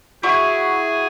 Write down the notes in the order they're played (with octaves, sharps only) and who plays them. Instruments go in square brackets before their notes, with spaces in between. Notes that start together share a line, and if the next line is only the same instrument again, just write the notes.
[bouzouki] E4 F#4 [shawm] G#4